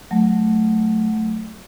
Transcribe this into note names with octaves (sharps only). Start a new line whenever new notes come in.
F#3 A3